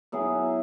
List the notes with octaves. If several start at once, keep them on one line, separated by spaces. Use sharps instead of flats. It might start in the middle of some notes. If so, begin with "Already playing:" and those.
F#3 B3 E4 G#4